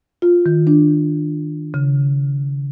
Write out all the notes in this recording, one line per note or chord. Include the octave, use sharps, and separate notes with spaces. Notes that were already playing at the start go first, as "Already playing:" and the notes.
F4
D#3
D4
C#3